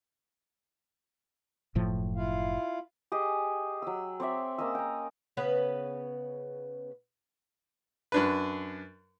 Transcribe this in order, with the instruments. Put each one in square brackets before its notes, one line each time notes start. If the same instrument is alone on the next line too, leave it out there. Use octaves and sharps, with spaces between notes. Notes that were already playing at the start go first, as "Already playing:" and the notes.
[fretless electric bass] F#1 A2 F3
[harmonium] E4 F4 F5
[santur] G4 G#4 D#5
F#3 E6
C4 C#5 D5 E5
A#3 C#4 D#5 E6
G5 A#5
[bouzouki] C#3 B3 B4
[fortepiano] F#2 D4 B4